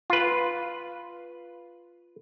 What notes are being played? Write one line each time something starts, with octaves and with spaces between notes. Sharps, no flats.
F4 B4